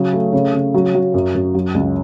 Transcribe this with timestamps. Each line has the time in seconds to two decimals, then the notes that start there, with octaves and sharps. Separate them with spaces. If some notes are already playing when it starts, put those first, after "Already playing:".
Already playing: C#3 F#3
0.13 A3
0.33 C#3
0.53 C#3
0.74 F#3
0.95 F#3
1.14 F#2
1.35 F#2
1.55 F#3
1.74 C#2